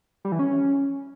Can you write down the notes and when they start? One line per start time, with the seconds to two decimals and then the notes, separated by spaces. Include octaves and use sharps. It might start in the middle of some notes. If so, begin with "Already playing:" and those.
0.25 G3
0.32 E3
0.39 C#4